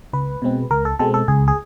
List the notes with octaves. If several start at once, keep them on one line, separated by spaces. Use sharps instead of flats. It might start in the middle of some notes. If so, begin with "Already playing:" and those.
C#2 B4
B2 G#3 C4
C#2 A#4
A4
B2 G#3 C4 A4
A4
C#2 G#4
G#4